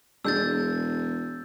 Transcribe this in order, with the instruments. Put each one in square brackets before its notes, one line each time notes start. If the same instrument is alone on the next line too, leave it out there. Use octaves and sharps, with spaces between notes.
[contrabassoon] E1 [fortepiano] G#3 D4 [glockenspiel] E6 G6 A6